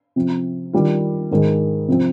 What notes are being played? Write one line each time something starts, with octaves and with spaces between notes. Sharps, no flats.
C3 F3 C4
D#3 G3 D4 F4
G#2 D#3 G#3
C3 F3 C4